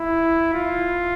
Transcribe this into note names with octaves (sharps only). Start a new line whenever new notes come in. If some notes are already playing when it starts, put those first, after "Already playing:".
Already playing: E4
F4